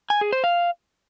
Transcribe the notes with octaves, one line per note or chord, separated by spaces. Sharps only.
G#5
G#4
C5
F5